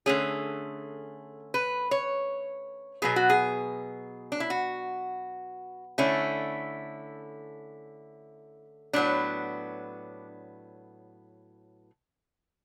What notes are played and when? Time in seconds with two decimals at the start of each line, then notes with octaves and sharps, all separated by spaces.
0.06 D3 A3 C#4 G#4
1.54 B4
1.91 C#5
3.02 B2 F#3 B3 G#4
3.16 F#4
3.29 G#4
4.32 D4
4.40 E4
4.50 F#4
5.98 D3 A3 C#4 E4
8.93 A2 F#3 B3 D4